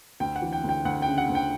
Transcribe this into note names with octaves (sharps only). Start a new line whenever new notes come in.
D2 G5
F#5
E3
G5
D2
G5
D2 F#5
C#3 G5
F#5
D2
G5